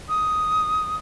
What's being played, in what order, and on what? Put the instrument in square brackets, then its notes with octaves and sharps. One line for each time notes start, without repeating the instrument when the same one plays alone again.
[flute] D#6